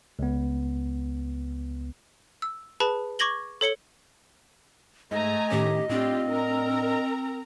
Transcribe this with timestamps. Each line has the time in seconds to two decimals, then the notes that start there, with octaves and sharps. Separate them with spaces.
0.19 C#2 B3
2.42 E6
2.80 G#4 B4 A5 B5
3.19 C#6 D6 G#6 A#6 F#7 G7
3.61 A4 C#5 C#7 G7
5.11 G#2 A3 D#5 G#5 A#5
5.51 A2 D#3 C#4 G4
5.89 A2 C4 D4 F4 G4
6.28 A#4 A#5